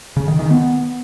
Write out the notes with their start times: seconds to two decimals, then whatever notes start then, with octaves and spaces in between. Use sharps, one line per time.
0.17 C#3
0.28 D#3
0.39 D#3
0.50 B3